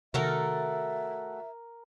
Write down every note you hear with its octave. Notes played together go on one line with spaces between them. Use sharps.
C3 D#3 A3 F#4 A4 A#4 E5